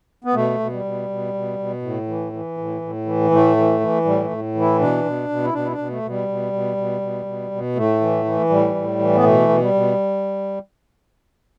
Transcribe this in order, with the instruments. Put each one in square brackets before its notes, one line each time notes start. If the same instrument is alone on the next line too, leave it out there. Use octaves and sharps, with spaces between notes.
[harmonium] B3
B2 A3
B2
G3
B2
B2
B2
B2
A2
E3
E3
A2
A2
E3
A2 A3
E3
E3
A2 G3
A3
A2
E3
E4
B2 D4
B2
B2
E4
B2 D4
E4
D4
B2
A3
B2
G3
B2
B2
B2
B2
B2
B2
A2 A3
E3
E3
A2 G3
A2
E3
B3
B2 A3
B2
G3
B2